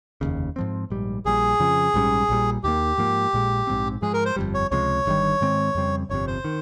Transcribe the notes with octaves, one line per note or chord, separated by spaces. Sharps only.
F1 D#2 C#3
G#2 F3 C4
A#1 G#2 G3
A#1 A#2 G3 G#4
F2 C#3 F3
A#1 G#2 G3 C#4
A#1 A#2 G3
D#2 D#3 A#3 G4
G#2 F3 A#3
A#1 A#2 G#3
A#1 G#2 G3 C4
G#2 F3 G#3 G#4
A#4
C5
G1 F2 C#3 G3
C#5
C#2 C3 F3 G#3 C#5
G1 G2 D#3 G3
G#2 D#3 G#3 C4
F2 C#3 G3 C4
G1 F2 C3 C#5
C5
D#3